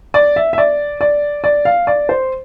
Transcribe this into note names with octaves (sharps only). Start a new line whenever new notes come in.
D5
E5
E5
D5
D5
D5
F5
D5
C5